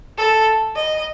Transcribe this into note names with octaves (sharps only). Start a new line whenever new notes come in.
A4
D#5